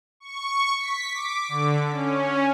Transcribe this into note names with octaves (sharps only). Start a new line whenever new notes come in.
C#6
B6
D6
D3
C#4